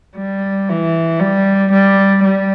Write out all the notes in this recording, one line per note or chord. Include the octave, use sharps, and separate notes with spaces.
G3
E3
G3
G3
G3